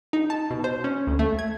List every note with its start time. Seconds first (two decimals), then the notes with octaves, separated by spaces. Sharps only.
0.13 D#4
0.30 A5
0.50 B2
0.64 C5
0.84 C#4
1.07 D2
1.19 A3
1.39 G#6